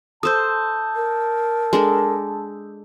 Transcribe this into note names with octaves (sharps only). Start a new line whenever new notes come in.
A4 C5 A5 D#6 E6 G6
A#4
G#3 D4 A4